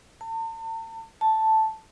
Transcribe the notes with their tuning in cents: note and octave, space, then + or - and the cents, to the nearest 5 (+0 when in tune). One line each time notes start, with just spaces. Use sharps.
A5 +40
A5 +0